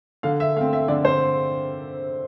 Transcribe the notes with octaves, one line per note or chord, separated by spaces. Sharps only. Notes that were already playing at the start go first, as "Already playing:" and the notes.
D3 F5
E5
A3 C4 F5
E5
D3 D5
C5